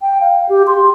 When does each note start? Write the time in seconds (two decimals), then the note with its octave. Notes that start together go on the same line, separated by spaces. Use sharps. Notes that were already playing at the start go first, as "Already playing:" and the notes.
0.01 G5
0.21 F5
0.49 G4
0.67 C6